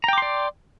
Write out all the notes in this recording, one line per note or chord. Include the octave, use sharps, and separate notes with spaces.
D5 G5 A#5 C6 D6